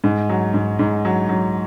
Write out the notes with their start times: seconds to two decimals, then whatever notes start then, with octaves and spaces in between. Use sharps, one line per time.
0.04 G#2
0.29 F#3
0.54 G#2
0.79 G#2
1.05 F#3
1.29 F#3